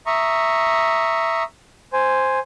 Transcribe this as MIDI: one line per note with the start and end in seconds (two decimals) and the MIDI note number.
0.06 1.43 76
0.06 1.43 82
0.06 1.43 85
0.06 1.43 87
1.93 2.39 72
1.93 2.39 80